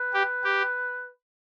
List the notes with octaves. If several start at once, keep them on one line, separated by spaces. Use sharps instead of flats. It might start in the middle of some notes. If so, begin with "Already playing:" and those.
Already playing: B4
G4
G4